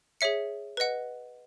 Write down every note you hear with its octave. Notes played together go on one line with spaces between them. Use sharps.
G#4 C#5 E5 C#7
B4 D#5 F#5